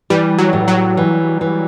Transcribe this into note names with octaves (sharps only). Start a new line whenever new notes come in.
E3 G3
F#3
A2
F#3
E3
E3